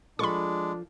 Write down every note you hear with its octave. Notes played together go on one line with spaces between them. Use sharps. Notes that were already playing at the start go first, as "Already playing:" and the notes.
F3 G#3 D4 F4 A4 B5 C#6